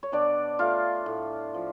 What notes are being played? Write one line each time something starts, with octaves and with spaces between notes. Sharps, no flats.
C#5
B2 D4 D5
A3 F4 F5
A2
F3